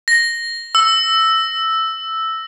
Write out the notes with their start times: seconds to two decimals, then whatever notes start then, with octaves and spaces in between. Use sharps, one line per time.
0.08 A#6
0.75 E6